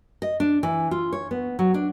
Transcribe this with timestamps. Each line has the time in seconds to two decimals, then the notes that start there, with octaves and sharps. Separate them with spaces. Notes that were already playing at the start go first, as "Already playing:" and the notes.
0.22 D#5
0.40 D4
0.63 E3
0.91 F4
1.13 C#5
1.31 B3
1.59 F#3
1.74 D4